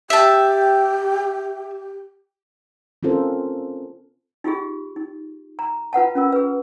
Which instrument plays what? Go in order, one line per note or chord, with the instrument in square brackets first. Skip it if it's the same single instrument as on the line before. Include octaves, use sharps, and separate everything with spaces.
[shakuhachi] G4 [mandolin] E5 A5
[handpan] C4 C#4 F4 A4 A#4 C5
[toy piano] D#4 F4 G4 G#4
D#4
A#5
F4 B4 F#5 A5
C#4 F4 A#4
G#4 B4